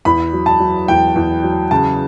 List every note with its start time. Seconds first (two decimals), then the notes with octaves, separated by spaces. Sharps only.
0.05 E2 B5
0.33 F#3
0.46 A5
0.60 F#3
0.88 E2 G5
1.16 E2
1.44 F#3
1.71 C#3 A5